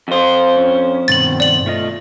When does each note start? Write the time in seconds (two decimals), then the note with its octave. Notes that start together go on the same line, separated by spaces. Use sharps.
0.08 F2 C5
0.57 C#4
1.08 G2 B2 D#3 A6 F#7
1.40 D5 F#7
1.66 A3 F4 D#5